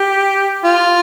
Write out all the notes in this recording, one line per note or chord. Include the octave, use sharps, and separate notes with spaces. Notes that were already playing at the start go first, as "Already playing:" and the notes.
Already playing: G4
F4